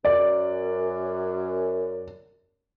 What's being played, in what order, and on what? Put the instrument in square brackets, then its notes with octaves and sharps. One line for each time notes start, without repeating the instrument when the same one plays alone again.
[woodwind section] F#2 [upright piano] D5